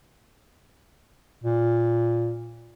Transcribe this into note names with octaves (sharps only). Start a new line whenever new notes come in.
A#2